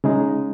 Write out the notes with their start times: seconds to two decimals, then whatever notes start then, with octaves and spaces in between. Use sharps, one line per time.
0.04 C#3 G#3 D#4